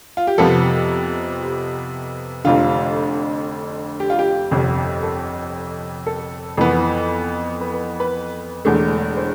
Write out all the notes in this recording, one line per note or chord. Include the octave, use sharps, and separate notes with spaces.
F4
G4
F2 C3 F3 B3 A4
G4
F1 F2 D3 F4
G4
F4
G4
G1 F2 C3
A4
A4
F2 E3 B3
B4
B4
B4
E1 E2 D3 A3
C5